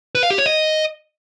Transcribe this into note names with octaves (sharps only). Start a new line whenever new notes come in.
B4
F5
G4
C#5
D#5